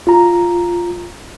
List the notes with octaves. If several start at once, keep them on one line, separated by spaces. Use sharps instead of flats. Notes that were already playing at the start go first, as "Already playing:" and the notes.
F4 A#5